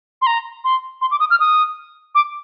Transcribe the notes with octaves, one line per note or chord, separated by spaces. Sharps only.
C6
A#5
C6
C6
D6
D#6
F6
D#6
D6